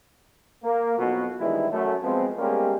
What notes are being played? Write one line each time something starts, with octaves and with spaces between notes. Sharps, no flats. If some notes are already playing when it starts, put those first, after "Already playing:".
A#3
B1 F2 B2
G2 D#3 E3 G#3 E4
F#2 A3
F3 G#3 B3 C4
G3 G#3 A#3 B3 C#4 G4